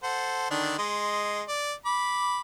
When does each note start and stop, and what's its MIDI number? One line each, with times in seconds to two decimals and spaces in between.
0.03 0.49 69
0.03 0.49 72
0.03 0.49 78
0.50 0.76 50
0.50 0.76 51
0.50 0.76 62
0.78 1.43 56
0.78 1.43 75
0.78 1.43 84
1.48 1.73 74
1.86 2.40 83
1.86 2.40 86